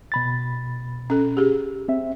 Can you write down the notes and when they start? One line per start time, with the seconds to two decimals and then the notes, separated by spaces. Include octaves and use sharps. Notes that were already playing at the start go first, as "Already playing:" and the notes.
0.12 B2 B5 A6
1.10 C#4 A4
1.37 G4 G#4
1.88 C4 E5